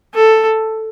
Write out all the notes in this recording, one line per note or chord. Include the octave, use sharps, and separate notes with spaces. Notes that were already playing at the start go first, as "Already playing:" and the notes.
A4